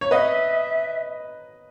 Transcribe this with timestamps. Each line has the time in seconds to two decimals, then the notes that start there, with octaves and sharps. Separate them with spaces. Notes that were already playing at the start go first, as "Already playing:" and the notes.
0.01 C#5
0.11 B4 D#5 E5 F#5